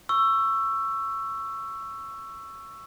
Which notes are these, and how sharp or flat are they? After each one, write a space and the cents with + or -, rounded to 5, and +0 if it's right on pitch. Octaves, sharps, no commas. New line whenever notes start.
C#6 +0 E6 +15